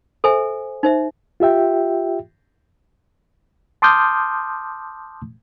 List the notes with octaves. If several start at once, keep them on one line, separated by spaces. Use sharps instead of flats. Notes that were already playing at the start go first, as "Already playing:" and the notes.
A4 C5 E5 G#5
D#4 C5 E5
F4 G4 E5 G5
A5 C6 D6 D#6 F6 G6